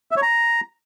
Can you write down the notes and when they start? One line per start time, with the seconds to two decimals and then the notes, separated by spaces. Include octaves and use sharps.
0.11 E5
0.17 C#5
0.22 A#5